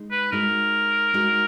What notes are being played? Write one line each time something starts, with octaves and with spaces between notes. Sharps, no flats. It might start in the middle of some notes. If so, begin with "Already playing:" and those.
Already playing: G#3 D#4
B4
G#3 D#4 F#4 A#4
G#3 D#4 F#4